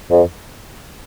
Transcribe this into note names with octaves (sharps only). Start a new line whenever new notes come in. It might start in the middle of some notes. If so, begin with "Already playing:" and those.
F2